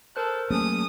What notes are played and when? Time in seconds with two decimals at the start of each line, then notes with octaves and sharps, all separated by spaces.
0.16 A4 A#4 C5 F#6
0.50 F#3 A3 A#3 C#4 G#4 D#6